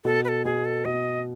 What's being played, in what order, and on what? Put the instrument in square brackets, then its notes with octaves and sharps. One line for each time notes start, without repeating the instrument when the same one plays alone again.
[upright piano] B2 [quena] A4
[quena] B4
A4
[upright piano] B2 [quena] G#4
[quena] A4
[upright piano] B2 [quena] D#5